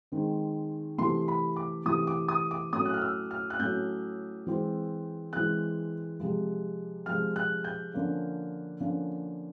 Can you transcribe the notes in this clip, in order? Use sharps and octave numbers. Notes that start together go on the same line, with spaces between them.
D#3 G#3 C4
C3 E3 A3 C6
B5
D6
C3 E3 A3 D#6
D6
D#6
D6
A2 F#3 A3 C#4 D#6
F#6
F6
E6
F6
F#6
A2 F#3 A3 C#4 G6
E3 G#3 C4
E3 G#3 C4 F#6
C3 F3 G#3
C3 F3 G#3 F6
F#6
G6
D3 F3 A#3 C#4
D3 F3 A#3 C#4